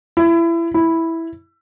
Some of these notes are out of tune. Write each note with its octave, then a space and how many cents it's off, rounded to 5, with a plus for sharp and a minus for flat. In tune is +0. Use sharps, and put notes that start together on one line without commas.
E4 +25
E4 -5